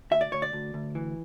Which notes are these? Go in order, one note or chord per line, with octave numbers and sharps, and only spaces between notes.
D2 E5
D5
D2 C#5
D5
D2
D2
E3